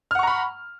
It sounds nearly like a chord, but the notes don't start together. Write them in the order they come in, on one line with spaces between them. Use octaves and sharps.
F6 F#5 C#6 A#5 B5